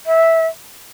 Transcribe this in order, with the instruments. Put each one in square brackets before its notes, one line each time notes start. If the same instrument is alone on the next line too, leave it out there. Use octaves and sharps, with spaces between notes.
[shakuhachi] E5